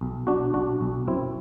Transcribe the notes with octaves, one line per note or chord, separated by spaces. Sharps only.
B1
B1 D4 F#4
B1 D4 F#4
B1
F#2 C4 E4